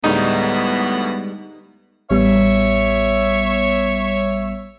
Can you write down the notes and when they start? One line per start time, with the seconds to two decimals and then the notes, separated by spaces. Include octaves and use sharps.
0.04 D2 A2 G3 G#3 B3 D#4
2.11 A1 G3 B3 C#5 E5